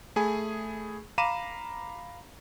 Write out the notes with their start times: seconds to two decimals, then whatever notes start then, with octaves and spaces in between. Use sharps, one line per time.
0.16 A3 G#4 G#5 B5
1.18 F5 A#5 B5 D6 D#7 E7